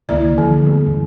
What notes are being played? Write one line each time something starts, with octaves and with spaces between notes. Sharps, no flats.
C#2 D3 D#3 A#3 E4 D5
D3 E3 F3
G3 A3 B3
E1 F#2 E3